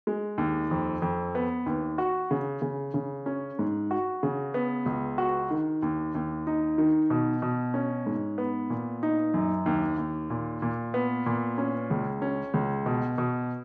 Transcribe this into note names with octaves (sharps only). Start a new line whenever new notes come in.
G#3
D#2
F2
F2
B3
D#2
F#4
C#3
C#3
C#3
C#4
G#2
F#4
C#3
B3
C#2
F#4
D#3
D#2
D#2
D#4
D#3
B2
B2
C#4
G#2
B3
A#2
D#4
F#2
D#2
D#2
A#2
A#2
B3
A#2
C#4
C#2
C#4
C#2
B2
B2